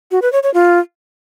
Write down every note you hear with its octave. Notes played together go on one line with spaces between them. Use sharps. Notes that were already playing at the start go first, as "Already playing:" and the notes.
F#4
B4
C#5
C#5
F4